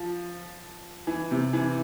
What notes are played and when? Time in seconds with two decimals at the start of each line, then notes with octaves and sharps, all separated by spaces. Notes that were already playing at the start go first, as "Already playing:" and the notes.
Already playing: F3
1.07 E3
1.31 C3
1.53 E3